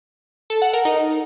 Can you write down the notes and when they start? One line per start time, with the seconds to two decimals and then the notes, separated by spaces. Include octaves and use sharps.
0.50 A4
0.62 F#5
0.73 A#4
0.85 D#4